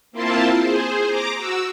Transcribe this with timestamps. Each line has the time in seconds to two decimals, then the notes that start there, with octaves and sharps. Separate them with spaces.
0.12 A#3 C4 E4 F4 C5 A5
0.57 G#4 C5
1.08 A#5 D6
1.36 F#4 E6